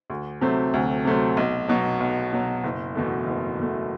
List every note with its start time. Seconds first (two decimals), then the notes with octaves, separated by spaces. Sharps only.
0.10 D2
0.41 C3 F#3 A3 C4
0.74 D2
1.05 C3 F#3 A3 C4
1.37 B1
1.68 B2 F#3
2.01 B1
2.33 B2 F#3
2.64 F#1
2.95 E2 B2 A3
3.27 F#1
3.59 E2 B2 A3